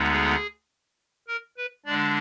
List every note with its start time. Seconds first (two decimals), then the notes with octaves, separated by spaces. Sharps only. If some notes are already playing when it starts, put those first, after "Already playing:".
Already playing: D2 D3 G#3 B3 D#4
0.12 G#4
1.28 A#4
1.57 B4
1.85 D3 G#3 D4 D5